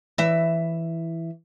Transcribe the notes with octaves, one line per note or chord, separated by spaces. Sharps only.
E3 E5